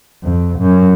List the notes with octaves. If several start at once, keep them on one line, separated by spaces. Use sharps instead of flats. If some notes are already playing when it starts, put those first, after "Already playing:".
F2
F#2